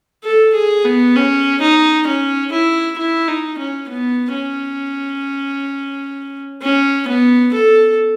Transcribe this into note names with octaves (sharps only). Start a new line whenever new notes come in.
A4
G#4
B3
C#4
D#4
C#4
E4
E4
D#4
C#4
B3
C#4
C#4
B3
A4